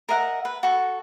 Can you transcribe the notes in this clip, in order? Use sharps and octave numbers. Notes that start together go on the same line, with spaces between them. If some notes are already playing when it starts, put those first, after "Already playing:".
A#4 D#5 E5 F#5
B4
F#4 A4